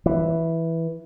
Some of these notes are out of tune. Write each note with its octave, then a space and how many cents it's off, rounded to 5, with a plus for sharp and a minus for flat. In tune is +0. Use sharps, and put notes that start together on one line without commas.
E3 -5